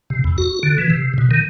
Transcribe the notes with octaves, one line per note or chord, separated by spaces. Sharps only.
C3
E2
F#4
D3
E3
C3
B2
D#3